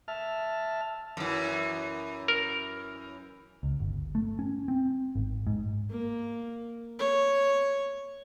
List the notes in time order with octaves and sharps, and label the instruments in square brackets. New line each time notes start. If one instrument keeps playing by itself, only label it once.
[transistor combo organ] E5 A5 F6
[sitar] F#2 E3
[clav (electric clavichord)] A#4
[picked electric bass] C#2
G1
A3
C#4
C4
G#1
G#2
[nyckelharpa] A#3
C#5